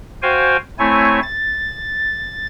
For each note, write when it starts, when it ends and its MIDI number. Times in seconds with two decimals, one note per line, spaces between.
0.22 0.57 66
0.22 0.57 72
0.22 0.57 77
0.22 0.57 79
0.22 0.57 80
0.79 1.20 57
0.79 1.20 60
0.79 1.20 64
0.79 1.20 73
0.79 1.20 80
1.22 2.46 93